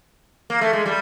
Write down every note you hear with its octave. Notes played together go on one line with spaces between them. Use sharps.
A#3
A3
G#3
G3